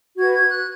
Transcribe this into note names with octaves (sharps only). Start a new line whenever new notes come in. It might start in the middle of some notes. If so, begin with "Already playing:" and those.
F#4 B4 G#6
G#6
F#6